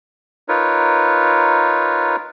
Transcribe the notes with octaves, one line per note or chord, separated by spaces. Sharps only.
D#4 F4 A#4 B4 C#5